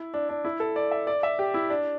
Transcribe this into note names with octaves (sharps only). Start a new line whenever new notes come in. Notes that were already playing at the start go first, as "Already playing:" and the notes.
Already playing: E4
D4
D4
E4
A4
D5
E5
D5
E5
G4
E4
D4